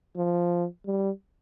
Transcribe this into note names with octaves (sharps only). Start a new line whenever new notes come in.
F3
G3